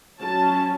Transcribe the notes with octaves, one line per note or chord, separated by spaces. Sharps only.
F#3 C#4 A5